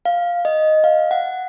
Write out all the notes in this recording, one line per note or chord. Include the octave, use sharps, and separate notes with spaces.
F5
D#5
F5
F#5